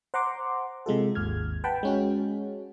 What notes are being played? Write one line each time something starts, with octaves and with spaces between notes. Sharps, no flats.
C5 F#5 A#5 C6 D6
C3 G#3 F4 A4
G#1 D#2 F6 G#6
B4 F#5 G5 A5 B5
G#3 C#4 F#4